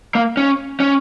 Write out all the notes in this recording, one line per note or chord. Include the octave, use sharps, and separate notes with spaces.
A#3
C#4
C#4